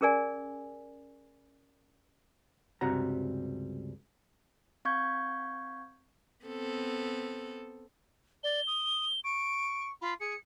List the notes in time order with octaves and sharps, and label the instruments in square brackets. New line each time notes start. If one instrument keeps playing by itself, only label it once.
[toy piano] C#4 G#4 A#4 D5 G#5
[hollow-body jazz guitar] C#2 G2 C3 G3 F#4 A#5
[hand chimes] C4 F5 C#6 G6 G#6
[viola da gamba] B3 C4 A4
[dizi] D5 [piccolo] G7
[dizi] D#6
[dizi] C#6 [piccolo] D7
[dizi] F4 [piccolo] B5
[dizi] G#4 [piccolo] C#7